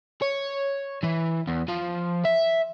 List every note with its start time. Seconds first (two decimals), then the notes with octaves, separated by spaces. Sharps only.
0.22 C#5
1.04 E3
1.48 E2
1.69 F3
2.25 E5